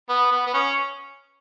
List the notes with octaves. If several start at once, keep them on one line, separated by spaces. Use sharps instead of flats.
B3
B3
B3
C#4